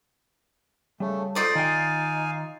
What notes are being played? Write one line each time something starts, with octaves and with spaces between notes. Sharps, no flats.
C#3 G3 A3
D#4 F4 A4 C5 D5 D#6
D#3 D#4 F5 G5 G#5